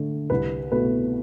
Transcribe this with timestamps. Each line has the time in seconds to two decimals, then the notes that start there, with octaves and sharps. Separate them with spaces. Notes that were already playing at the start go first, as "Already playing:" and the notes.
Already playing: D3 A3
0.30 C2 B4
0.72 B2 A3 B4